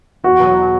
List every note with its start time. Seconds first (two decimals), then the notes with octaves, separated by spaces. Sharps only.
0.24 E2 F#4
0.40 B2 F#3